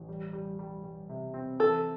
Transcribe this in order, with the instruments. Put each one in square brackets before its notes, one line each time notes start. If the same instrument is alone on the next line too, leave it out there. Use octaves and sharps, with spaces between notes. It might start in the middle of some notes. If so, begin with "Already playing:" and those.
Already playing: [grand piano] A1
G3
G3
G3
G3
C3
C4
[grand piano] E3 [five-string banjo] A4